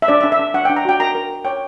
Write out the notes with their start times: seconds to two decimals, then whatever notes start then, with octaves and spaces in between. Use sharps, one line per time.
0.02 E5
0.08 D4 D5
0.21 E5
0.24 D4
0.32 E5
0.39 D4
0.54 D4 F#5
0.65 D4 G5
0.76 A#5
0.85 F#4 G5
1.00 A#4 A#5
1.15 A#4
1.31 A#4
1.45 C#5 G5